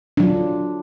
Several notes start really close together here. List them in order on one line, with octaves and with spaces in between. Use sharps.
D4 F#3 F4